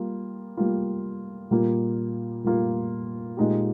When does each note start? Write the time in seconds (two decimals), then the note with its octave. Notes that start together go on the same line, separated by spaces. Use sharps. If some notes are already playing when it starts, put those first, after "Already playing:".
Already playing: G3 A#3 F4
0.57 G3 A#3 F4
1.51 A#2 G3 A#3 F4
2.44 A#2 G3 A#3 F4
3.37 A#2 G#3 D#4 G4